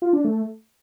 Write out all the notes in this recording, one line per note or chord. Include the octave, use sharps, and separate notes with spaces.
F4
D4
A3